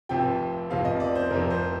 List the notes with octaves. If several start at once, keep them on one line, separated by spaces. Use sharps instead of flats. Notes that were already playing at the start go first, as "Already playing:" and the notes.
F1 F2 C3 F3 G5
F1 F2 C3 F3 F5
D#5
D5
C5
F1 F2 C3 F3 A#4
C5